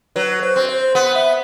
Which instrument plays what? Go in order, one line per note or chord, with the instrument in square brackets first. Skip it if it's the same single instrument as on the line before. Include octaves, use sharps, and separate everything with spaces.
[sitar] F#3 [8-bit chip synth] B4
[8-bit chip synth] C5
[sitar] C4
[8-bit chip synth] C5
[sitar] B3 [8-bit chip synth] F#5
[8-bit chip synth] E5